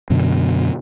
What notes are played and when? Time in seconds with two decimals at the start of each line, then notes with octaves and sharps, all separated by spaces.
0.10 F#2 B2 D3